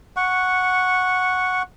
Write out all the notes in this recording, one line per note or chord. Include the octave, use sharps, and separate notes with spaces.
F#5 C#6